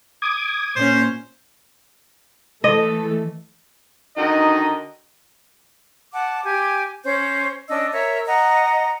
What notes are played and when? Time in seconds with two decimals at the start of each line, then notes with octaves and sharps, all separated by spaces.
0.22 D6 D#6 G#6
0.76 A#2 C#4 C5
2.64 E3 A3 A4 D#5
4.17 D3 D#3 D#4 F#4 D#5
6.14 F#5 A5 D6
6.43 G4 G#5
7.04 C#4 C5 C#5 G6
7.69 C#4 D4 D#5 E6
7.92 A#4 C#5 E5
8.26 D#5 F#5 A#5